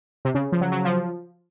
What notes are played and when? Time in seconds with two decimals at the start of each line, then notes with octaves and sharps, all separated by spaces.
0.25 C3
0.35 C#3
0.52 F3
0.61 F#3
0.72 F#3
0.85 F3